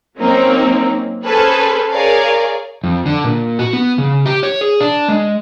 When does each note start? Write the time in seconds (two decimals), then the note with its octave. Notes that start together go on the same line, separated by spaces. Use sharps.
0.20 F#3 A#3 C4 C#4 D#4
1.23 C#4 G#4 A4 B4 C5
1.90 G#4 A#4 C#5 D5 F5
2.84 F2
3.06 D3
3.24 A#2
3.59 F#4
3.73 B3
3.98 C#3
4.26 G4
4.43 C#5
4.61 G#4
4.80 D4
5.08 G#3